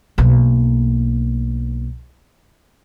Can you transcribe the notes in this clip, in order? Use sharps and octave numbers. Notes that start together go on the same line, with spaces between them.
B1 A#3